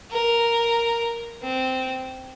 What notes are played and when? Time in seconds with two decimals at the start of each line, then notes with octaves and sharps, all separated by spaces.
0.11 A#4
1.43 C4